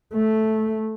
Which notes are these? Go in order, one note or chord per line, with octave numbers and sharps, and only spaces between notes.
A3